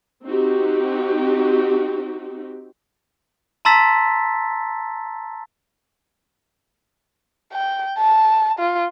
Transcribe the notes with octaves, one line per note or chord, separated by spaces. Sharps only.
C4 D#4 F#4 G4
A5 A#5 C6 E6 A6 B6
G5
A5
F4